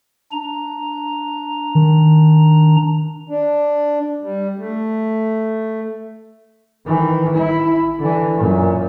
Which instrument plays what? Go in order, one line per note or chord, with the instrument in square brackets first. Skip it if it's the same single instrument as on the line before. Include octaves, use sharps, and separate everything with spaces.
[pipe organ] D4 A#5
[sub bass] D#3
[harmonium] D4
G3
A3
[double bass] D#3 E3
E4
D3 E3
F#2 A#2